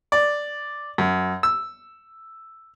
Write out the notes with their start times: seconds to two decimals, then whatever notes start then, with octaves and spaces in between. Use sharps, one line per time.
0.12 D5
0.98 F#2
1.43 E6